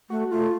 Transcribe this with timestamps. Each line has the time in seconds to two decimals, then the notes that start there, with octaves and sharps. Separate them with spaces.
0.09 A3 F#4
0.31 A3 F4